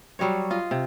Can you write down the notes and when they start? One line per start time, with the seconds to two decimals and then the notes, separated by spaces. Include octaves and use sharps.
0.19 F#3 G3 F#4 C#5
0.51 F4 D#5
0.71 C3